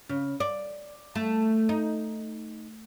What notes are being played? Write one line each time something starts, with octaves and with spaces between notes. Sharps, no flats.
C#3
D5
A3
D#4